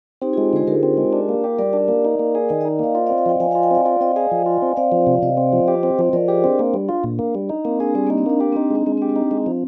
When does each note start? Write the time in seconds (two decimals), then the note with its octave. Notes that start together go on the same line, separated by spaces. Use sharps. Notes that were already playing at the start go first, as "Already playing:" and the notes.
0.22 C4 D#4 G4
0.33 F4 G#4
0.38 G#3
0.53 D3 G#4 C5
0.67 D3 G4 A#4
0.83 C4
0.97 G#3
1.13 D4
1.29 A#3
1.44 G4
1.59 G3 A#4 D5
1.73 D4
1.88 A#3
2.05 D#4
2.19 A#3
2.35 G#4
2.49 D#3 D#5 G5
2.61 D#5 G5
2.65 D#4
2.79 A#3 D5 F5
2.95 F4 C5 D#5
3.06 D5 F5
3.10 C4
3.18 D5 F5
3.26 F3 D#5 G5
3.40 F3 F5 G#5
3.51 F4 F5 G#5
3.63 D#5 G5
3.71 C4 D5 F5
3.85 F4 D5 F5
4.01 C4 D#5 G5
4.16 G#4 F5 G#5
4.32 F3
4.46 F4
4.62 C4
4.76 C4 D5 F5
4.92 F3
5.07 C3
5.22 C3 C5 D#5
5.37 C4
5.53 F3
5.68 G4
5.83 C4
5.99 F3
6.13 F3 A#4 D5
6.28 G4 G#4 C5
6.44 C4 D4
6.59 A#3
6.74 G3
6.89 F4
7.04 A#2
7.19 A#3
7.35 G3
7.50 D#4
7.65 A#3 C4
7.80 D4 G#4
7.95 G3 C4
8.07 A#3
8.10 D#4
8.18 C4
8.26 A#3 D4
8.40 D4 G4
8.52 C4
8.56 D#4
8.70 G#3 C4
8.86 G#3 C4
8.97 C4
9.02 G4
9.09 C4
9.16 D#4
9.31 G#3 C4
9.46 F3